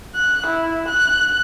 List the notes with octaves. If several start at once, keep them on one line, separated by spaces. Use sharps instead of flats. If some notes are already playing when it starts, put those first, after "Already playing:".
F#6
E4
F#6